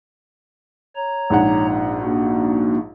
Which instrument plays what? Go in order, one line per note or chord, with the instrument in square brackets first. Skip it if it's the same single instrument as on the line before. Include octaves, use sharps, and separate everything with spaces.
[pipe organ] C#5 A#5
[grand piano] A#1 G#2 F#5
[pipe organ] A#3 D4 F#4